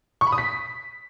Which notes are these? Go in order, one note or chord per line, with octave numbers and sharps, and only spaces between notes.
C#6
B5
D#6
B6